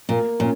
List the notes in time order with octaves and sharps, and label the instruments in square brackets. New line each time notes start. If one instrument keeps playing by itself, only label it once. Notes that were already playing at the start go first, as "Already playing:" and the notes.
[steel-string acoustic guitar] A#2 [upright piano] A#3
[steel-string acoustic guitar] A#2 [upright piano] C#4